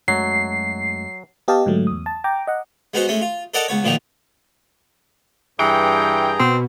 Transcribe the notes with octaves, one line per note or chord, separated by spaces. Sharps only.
F#2 F#3 G#3 A3 C7
B3 G4 D#5 F5 A5
G#2 D3 F#3 A3
E2 D#6
A5
G5 A#5 D6
D#5 F#5
G#3 B3 D#4 F#4 C5
G#3 A3 C#4
F4
A4 A#4 D5 D#5 F#5 A5
C#2 B3 C#5
B1 A#2 D#3 F3 B3 D#4
G2 E3 G#4 G5 A#5
B2 C4